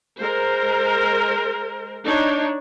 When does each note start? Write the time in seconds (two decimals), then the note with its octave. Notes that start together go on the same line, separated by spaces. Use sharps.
0.21 G#3 A#4 C5
2.05 D4 D#4 C#5